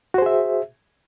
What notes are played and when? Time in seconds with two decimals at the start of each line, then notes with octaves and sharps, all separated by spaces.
0.14 F#4
0.18 C5
0.22 G#4
0.26 E5